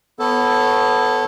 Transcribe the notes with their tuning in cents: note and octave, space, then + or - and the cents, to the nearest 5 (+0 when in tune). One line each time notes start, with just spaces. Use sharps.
B3 +0 A4 +0 C#5 -35